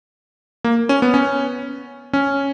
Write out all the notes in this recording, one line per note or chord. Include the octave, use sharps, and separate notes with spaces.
A#3
C#4
B3
C#4
C#4